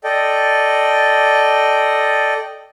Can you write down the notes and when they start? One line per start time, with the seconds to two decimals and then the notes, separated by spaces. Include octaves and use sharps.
0.04 A4 D5 D#5 G5